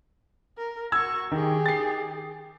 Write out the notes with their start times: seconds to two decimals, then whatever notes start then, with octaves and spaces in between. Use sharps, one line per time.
0.57 A#4
0.92 F#4 C#6 E6 G#6
1.31 D#3 G4 G#4
1.66 A6 C7